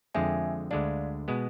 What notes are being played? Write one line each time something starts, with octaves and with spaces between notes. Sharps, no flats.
F2 D3 G#3 C4 E5 G#5
D2 D3 G#3 D4 D5 F5
B2 G#3 B3